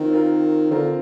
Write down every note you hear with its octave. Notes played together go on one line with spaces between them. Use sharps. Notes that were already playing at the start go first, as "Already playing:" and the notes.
Already playing: D#3 C4 F4 A#4
C4 F4 A#4
D3 C4 F4 A#4